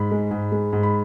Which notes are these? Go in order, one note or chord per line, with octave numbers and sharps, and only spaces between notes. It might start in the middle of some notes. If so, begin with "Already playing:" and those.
Already playing: G#2 B5
G#3
G#2
G#3
G#2
B5